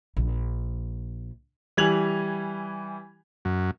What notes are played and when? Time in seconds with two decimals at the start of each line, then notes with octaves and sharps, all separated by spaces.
0.17 A#1
1.77 E3 G3 G#5 G#6 F7 F#7
3.45 F#2